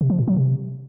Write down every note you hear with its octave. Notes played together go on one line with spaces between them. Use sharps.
C3
F3
A#2
F#3
C3